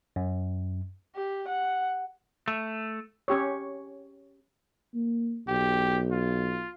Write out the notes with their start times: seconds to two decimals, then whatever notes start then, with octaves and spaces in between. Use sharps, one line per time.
0.16 F#2
1.15 G4
1.48 F#5
2.48 A3
3.28 C#4 G4 C#5
4.94 A#3
5.48 B1 G4
6.11 F4